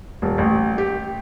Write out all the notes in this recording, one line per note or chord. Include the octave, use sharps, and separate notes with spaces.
D#1
A1
G4